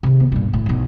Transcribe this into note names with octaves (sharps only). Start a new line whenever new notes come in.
C3 D#3
B3
G2 A#2
A2
B1 E2